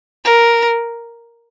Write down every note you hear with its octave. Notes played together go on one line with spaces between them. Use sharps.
A#4